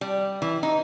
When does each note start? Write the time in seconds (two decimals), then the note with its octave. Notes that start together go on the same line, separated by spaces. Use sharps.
0.01 G3
0.42 E3
0.63 D#4